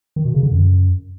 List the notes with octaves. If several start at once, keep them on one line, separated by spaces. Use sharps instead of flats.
D#3
B2
C#3
D3
F#2